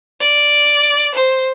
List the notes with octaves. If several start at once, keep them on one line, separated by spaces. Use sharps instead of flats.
D5
C5